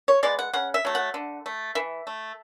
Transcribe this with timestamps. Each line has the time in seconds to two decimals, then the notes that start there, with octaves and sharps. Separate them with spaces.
0.08 C#5
0.23 G#3 B3 D5
0.39 F#5
0.53 C#3 F#5
0.74 E5
0.85 F#3 A3
0.95 F#5
1.14 D3
1.46 A3
1.75 E3 E5
2.07 A3